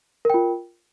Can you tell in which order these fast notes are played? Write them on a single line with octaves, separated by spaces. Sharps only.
A#4 G5 F4